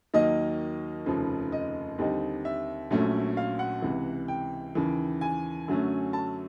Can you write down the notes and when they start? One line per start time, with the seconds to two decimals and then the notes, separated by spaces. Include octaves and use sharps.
0.14 D#2 D#3 F#3 A#3 D#4 D#5
1.06 F1 D#2 C#3 F3
1.52 D#5
1.98 D#2 D3 G3 C4 D#4
2.45 E5
2.91 A#1 A#2 F#3 A3 C#4
3.37 F5
3.59 F#5
3.82 C#2 C3 E3
4.28 G5
4.75 D#2 C#3 E3
5.21 G#5
5.68 F#2 D3 F#3 A3 C#4
6.13 A5